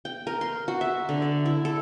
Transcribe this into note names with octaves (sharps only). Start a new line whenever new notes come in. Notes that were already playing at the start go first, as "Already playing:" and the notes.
G5
A#4
C6
F#4
E5
D3
D5
E4
A4